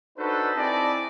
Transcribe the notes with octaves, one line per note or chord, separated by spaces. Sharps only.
D4 D#4 F#4 A4 B4 C5
C4 E4 G#4 D5 D#5 A5